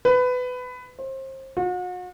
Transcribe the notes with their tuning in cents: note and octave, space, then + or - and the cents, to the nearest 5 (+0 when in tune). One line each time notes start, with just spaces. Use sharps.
B4 +20
C5 +30
F#4 -40